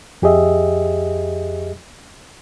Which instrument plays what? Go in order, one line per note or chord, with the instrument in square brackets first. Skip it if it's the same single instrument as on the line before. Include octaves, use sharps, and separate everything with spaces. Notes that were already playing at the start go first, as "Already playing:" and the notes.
[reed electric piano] F2 G4 G#4 D#5 E5